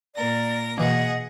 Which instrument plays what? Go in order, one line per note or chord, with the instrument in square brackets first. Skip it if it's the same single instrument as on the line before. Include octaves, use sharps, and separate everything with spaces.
[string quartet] A#2 A#4 A#6 [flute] D5
[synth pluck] B2 E3 A#3 [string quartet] G#4 F#5 [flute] D#5